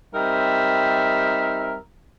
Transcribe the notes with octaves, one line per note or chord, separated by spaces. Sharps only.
G3 C4 D#4 A#4 E5